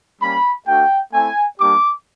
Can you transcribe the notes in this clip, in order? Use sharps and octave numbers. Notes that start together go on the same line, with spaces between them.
G3 A#3 C#4 B5
A3 D4 F#4 G5
A3 C4 E4 G#5
G3 A#3 D4 G4 D6